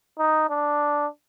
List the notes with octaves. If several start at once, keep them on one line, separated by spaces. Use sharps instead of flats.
D#4
D4